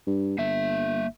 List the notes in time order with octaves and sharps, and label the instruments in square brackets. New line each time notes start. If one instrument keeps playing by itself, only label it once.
[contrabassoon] G2
[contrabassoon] G1 [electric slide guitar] A#3 E5